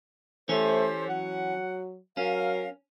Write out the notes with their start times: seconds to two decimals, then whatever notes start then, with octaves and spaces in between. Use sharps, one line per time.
0.49 E3 A3 C#4 G4 A4 C5
1.08 F#3 F#5
2.17 F#3 C#4 A#4 F5